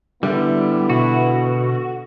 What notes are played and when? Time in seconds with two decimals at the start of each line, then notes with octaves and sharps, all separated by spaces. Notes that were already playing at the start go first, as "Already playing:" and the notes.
0.23 D3 G3 B3 E4
0.90 B2 F#4